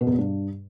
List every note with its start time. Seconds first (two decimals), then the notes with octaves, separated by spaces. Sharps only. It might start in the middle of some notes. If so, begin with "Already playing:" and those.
0.01 B2
0.07 E2
0.13 B2
0.18 G2